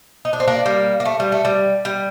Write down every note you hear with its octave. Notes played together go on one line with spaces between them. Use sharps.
D#4
D4
C4
A#3 D4
G3 A#3
A#3
A3
G3
A3
G3
G3